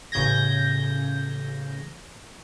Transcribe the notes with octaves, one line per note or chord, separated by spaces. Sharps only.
A1 C#3 G6 G#6 A#6